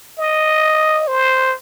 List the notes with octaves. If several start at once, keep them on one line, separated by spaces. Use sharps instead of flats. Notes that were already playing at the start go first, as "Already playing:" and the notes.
D#5
C5